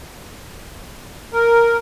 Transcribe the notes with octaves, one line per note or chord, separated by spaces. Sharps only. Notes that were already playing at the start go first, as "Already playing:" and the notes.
A#4